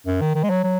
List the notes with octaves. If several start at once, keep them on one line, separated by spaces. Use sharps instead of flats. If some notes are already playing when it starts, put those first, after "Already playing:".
F#2
D#3
D#3
G#3
F#3
F#3